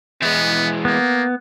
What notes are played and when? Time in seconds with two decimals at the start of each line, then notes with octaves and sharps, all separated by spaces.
0.22 E3 G#3 B3
0.85 A#3 B3